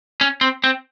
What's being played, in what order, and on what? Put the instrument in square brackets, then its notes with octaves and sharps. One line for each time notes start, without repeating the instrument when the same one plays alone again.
[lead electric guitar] C#4
C4
C4